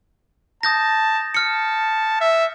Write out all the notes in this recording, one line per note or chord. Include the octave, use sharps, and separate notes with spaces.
A5 D#6 G6 A#6
A5 F6 C#7
E5